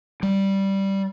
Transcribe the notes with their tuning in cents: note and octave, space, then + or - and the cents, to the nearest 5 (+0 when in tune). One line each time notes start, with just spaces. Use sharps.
G3 -5